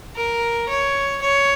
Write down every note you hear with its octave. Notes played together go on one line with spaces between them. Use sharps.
A#4
C#5
C#5